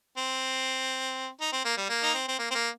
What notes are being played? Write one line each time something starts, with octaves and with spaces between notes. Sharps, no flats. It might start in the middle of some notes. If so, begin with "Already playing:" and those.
C4
D#4
C4
A#3
G3
A#3
D#4
C4
C4
A#3
C4
A#3